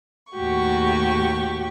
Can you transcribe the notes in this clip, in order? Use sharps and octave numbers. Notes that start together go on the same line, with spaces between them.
D#2 A2 F#4 G4 C#6